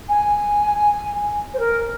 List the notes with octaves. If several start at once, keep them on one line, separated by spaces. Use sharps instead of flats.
G#5
C5
A#4